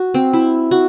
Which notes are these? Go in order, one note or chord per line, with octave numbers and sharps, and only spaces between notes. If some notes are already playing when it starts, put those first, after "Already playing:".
Already playing: F#4
C4
E4
F#4